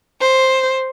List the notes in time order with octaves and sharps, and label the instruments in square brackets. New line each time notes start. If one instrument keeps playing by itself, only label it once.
[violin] C5